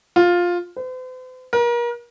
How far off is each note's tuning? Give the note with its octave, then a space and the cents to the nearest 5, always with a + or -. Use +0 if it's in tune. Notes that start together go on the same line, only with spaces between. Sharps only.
F4 +10
C5 -45
A#4 +35